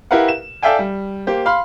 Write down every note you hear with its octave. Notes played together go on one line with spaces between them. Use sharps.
E4 G4 A#4 B4 F5 F#5
E7
A4 D5 E5 F5 G5 G#5
G3
A#3 G4 C5
F5 B5 C6 F6